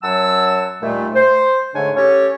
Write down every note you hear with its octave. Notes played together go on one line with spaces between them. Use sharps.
F#2 F#3 F#5 A5 E6
D#2 A#2 G3 A3
C5
G#2 D3 A3 D4 C#5 G#5
C#4 G4 A4 C#5